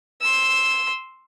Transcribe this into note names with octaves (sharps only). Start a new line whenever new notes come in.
C6 E6